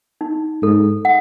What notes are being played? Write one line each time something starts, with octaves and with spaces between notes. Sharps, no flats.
D#4
G#2 A4
F#5